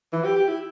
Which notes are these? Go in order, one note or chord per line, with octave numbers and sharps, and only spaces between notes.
E3
G4
G4
E4